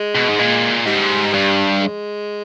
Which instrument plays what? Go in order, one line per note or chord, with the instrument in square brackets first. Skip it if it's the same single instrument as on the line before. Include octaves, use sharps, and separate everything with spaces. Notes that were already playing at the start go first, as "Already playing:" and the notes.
Already playing: [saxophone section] G#3
[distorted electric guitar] B2
G#2
A#2
[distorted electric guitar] G#2 [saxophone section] G3
[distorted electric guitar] G2
[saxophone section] G#3